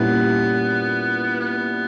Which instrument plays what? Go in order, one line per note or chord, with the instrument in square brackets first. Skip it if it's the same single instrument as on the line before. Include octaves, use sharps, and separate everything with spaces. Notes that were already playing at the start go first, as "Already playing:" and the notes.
Already playing: [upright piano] A#2 G3 C#4 E4 [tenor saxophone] B3
[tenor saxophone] B3